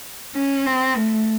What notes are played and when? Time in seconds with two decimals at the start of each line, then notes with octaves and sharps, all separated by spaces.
0.35 C#4
0.66 C4
0.97 A3